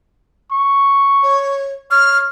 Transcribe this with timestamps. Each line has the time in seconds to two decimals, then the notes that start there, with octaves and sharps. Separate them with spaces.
0.52 C#6
1.23 C#5
1.91 C#5 F6